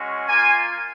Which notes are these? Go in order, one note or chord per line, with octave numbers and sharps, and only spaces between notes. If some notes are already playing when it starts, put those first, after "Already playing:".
Already playing: G#3 C#4 F#4
A#3 F4 G#5